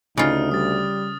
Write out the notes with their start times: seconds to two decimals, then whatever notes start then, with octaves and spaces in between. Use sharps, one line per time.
0.17 D2 C#3 D#4 F4 D#6 F6
0.51 G3 D#6 A6